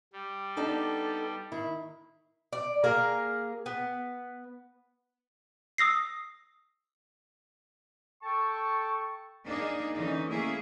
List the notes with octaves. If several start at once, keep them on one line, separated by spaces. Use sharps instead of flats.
G3
B3 D4 D#4 A4
D#3 E4
D5
A#3 G#4 A#4
B3
D#6 E6 A#6 C7
A4 G5 A5 C#6
A#3 D4 D#4 G#4
D3 E3 C#4 D#4
A3 A#3 C#4 E4 G#4